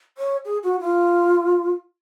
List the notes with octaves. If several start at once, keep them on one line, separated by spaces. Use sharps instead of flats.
C#5
G#4
F#4
F4